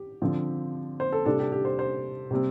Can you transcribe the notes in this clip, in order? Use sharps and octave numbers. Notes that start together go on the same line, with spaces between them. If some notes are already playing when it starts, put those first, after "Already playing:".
Already playing: G4
D3 F3 C4
C5
A4
C3 G3 D4 A4
G4
G4
C5
C5
C3 G3 C4